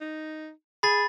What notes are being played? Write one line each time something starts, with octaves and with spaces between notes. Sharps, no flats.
D#4
G#4 B5 A6